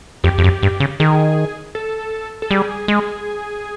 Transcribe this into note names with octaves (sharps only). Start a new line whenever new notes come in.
F2 G4
F2
F#2
G2
C#3
D#3 G#4
A4
A4
G3 G#4
G#3